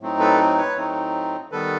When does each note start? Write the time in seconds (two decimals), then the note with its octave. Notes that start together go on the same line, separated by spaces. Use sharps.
0.01 A2 F#3 A3 C4 D#4
0.20 A4 B4
0.58 B4 C#5
0.76 A2 F#3 A3 C4 D#4
1.51 D#3 G3 B3 A4 B4